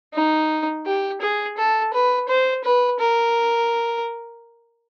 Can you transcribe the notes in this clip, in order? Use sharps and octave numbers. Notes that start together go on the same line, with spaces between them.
D#4
G4
G#4
A4
B4
C5
B4
A#4